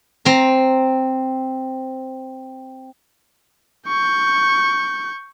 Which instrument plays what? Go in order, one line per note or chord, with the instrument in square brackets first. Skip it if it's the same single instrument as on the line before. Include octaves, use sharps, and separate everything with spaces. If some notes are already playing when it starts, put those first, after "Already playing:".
[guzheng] C4 A#5
[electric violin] C#6 G6